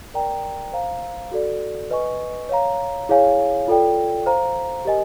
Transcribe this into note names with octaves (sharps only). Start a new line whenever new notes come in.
A#4 D5 G5 A#5
C5 F5 A#5
F#4 A4 D5
B4 D#5 G#5 C#6
C#5 F5 A#5
E4 G#4 C#5 F5 G#5
F4 A4 D5 G5
C5 F5 A#5
G4 A#4 D#5 G#5